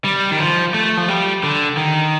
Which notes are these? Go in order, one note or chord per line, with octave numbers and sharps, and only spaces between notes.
G3
D#3
F3
A3
F3
G3
D3
D#3